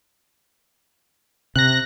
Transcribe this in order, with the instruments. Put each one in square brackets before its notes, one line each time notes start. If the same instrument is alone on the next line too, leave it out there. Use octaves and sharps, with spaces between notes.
[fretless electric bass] C3 [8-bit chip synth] F#6 A#6